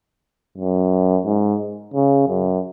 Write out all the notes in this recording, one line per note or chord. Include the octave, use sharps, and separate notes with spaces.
F#2
G#2
C#3
F#2